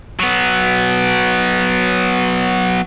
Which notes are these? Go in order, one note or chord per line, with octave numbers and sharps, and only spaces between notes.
F#3 B3